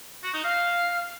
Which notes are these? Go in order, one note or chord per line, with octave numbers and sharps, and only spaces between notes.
F#4
D#4
F5